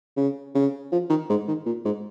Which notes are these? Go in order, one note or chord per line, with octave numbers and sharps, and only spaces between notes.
C#3
C#3
F3
D#3
G#2
D#3
A#2
G#2